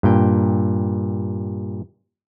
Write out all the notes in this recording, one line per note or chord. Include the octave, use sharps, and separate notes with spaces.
G2 A#2 G5